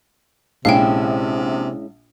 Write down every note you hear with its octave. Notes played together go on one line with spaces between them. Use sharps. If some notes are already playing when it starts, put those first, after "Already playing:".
A#1 C3 G#3 C#4 E4 F5 G5